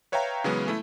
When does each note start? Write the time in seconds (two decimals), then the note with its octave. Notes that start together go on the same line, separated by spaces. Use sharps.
0.12 B4 C#5 E5 F5 G5 A#5
0.44 C#3 E3 F#3 G#3 B3 C#4
0.68 A3 E4